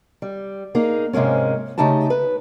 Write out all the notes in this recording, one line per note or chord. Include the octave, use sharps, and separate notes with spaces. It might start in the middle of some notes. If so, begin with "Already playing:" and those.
G3
A#3 D#4 G#4
G#2 C3 G#3 A#3 C#4
C#3 A3 D#4 G4 A5
B4